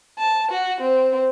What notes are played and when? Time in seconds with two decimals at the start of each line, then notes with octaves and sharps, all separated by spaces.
0.18 A5
0.51 F#4
0.81 C4